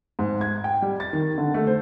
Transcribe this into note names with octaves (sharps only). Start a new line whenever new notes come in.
G#2
G#6
G5
G3
A6
D#3
D3
A3
C5